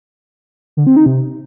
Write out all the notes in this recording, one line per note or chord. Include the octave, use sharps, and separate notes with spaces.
D3
C4
D#4
C3